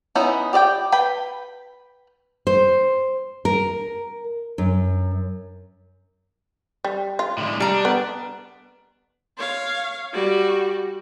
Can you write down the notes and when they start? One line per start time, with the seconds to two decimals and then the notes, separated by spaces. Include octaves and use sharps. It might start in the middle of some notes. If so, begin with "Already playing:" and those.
0.15 B3 C#4 D#4 E4
0.53 G4 D5 D#5 G5
0.92 B4 G5 B5
2.47 C5
3.45 A#4
4.58 F#2
6.85 G3
7.19 F4
7.38 A2 D3 G#3
7.60 G3 D4 A#5
7.85 B3
9.38 C#5 F5
10.13 G3 F#4